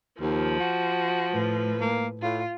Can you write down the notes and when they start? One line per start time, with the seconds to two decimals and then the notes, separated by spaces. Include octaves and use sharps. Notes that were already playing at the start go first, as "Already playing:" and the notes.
0.21 D#2 F3
0.60 F#4
1.32 A2 B4
1.81 A#3
2.21 A2 F4